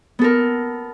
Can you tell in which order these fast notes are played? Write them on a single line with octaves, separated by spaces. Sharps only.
B3 A4 A#4